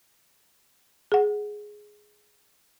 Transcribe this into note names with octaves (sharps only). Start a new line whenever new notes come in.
G#4 F#5